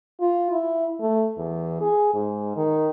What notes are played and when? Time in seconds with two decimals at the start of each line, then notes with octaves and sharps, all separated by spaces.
0.20 F4
0.52 E4
1.01 A3
1.37 E2
1.81 G#4
2.14 G#2
2.56 D#3